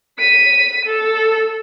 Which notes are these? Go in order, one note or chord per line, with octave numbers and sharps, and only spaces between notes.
B6 D#7
A4